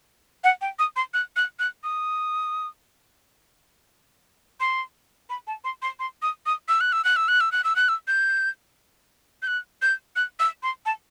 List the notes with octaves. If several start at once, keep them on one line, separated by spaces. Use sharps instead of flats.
F#5
G5
D#6
C6
F#6
F#6
F#6
D#6
C6
B5
A5
C6
C6
C6
D#6
D#6
E6
F#6
E6
F#6
E6
F#6
E6
F#6
E6
F#6
E6
G6
G6
F#6
G6
F#6
E6
C6
A5